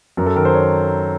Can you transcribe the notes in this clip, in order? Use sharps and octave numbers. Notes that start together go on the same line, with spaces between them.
F#2 A#4
A4
D#3 A#4
C5
C#5